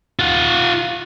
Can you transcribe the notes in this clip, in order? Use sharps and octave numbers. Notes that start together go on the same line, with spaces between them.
F4 F#5